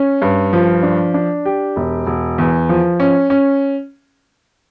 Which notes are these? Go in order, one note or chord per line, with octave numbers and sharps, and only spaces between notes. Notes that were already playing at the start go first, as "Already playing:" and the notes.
Already playing: C#4
G2
F3
D4
D4
G4
E1
E1
E2
F3
C#4
C#4